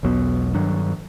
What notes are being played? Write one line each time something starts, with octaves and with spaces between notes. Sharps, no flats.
E1 B1 F#3 B3
G2 D#3 F#3 D4